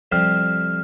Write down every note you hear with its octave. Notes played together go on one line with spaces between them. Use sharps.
F2 C3 G3 C4 F6